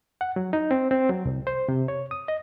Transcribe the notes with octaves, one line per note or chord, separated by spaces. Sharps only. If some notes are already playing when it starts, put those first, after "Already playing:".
F#5
F#3
D#4
C4
C4
F#3
C2
C5
C3
C#5
D#6
D#5